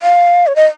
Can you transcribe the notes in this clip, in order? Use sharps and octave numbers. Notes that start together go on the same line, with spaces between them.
F5
C#5
D#5